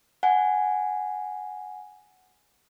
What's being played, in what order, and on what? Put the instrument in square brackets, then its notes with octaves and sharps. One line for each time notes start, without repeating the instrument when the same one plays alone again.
[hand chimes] F#5 G#5